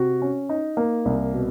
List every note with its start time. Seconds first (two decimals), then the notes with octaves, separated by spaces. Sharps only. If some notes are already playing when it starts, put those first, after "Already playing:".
Already playing: C3 F#4
0.22 C#4
0.49 D#4
0.77 A#3
1.05 C2
1.33 B2